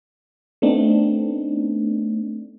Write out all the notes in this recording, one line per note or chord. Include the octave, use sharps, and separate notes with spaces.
A3 B3 C4 D4 D#4